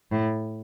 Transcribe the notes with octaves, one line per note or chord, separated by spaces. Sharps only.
A2